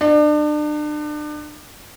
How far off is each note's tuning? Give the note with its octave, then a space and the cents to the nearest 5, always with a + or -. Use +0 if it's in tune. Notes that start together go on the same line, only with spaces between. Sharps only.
D4 +35